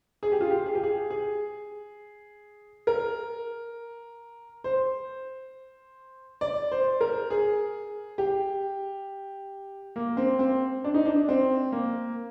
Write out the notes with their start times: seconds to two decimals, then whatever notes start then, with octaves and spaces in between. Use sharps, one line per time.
0.23 G#4
0.32 G4
0.41 F4
0.51 G4
0.66 G#4
0.75 G4
0.83 G#4
1.10 G#4
2.87 A#4
4.64 C5
6.41 D5
6.71 C5
7.01 A#4
7.31 G#4
8.18 G4
9.96 A#3
10.17 C4
10.39 C4
10.84 D4
10.94 D#4
11.05 D4
11.29 C4
11.72 A#3